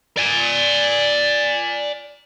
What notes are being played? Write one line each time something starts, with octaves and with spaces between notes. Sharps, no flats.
D5 G#5